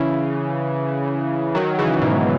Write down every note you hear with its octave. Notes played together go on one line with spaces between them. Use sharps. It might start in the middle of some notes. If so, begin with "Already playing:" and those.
Already playing: C#3 E3
D#3 F#3
C#3 E3
G#2 B2